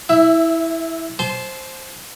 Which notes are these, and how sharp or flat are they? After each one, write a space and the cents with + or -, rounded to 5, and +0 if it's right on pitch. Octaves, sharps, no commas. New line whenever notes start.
E4 -15 E5 +10
C5 +10 A5 -35 C6 -5